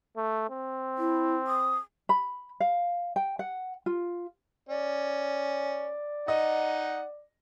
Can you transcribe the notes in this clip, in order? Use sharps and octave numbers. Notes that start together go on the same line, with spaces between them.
A3
C4
E4
D#6
B5
F5
G5
F#5
F4
C#4 D5
D#4 D#5 F#5